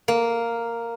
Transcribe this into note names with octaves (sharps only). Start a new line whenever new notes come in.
A#3